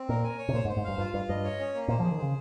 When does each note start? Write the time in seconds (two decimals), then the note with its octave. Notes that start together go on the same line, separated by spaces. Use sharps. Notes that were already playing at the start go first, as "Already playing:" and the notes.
Already playing: C4
0.09 A#2 A#4
0.24 G#5
0.38 C#5
0.49 C3
0.54 A#2 C5
0.65 G#2
0.69 C5
0.77 G#2
0.84 G2 F5
0.98 G2 F4
1.14 G2 F4
1.29 G2 D#5
1.44 C#5
1.59 C#4
1.74 A#3
1.88 A#2 C5
2.00 F3 G#4
2.11 D#3
2.19 C#3 C5